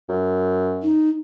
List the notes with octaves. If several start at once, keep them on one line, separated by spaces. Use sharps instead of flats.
F#2
D#4